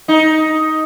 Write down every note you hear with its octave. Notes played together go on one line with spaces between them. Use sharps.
D#4